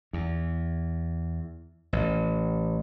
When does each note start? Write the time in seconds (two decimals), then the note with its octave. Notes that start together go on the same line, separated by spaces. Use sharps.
0.13 E2
1.93 A1